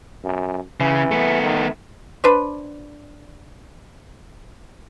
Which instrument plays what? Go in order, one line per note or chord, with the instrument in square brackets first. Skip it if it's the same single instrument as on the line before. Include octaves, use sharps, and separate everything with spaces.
[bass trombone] F#2
[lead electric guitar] C#3 [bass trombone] E3
[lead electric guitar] A3 B3
[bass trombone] D#3
[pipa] D4 B4 C5